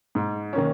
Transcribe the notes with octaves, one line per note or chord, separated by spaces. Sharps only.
G#2
D#3 A#3 C#4